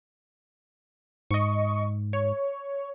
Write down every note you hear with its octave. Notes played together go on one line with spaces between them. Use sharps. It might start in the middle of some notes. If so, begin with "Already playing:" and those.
G#2 D#5 C#6
C#5